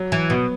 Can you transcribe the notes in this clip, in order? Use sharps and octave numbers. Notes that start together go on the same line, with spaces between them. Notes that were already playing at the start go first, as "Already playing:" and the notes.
Already playing: F#3
E3
B2 B3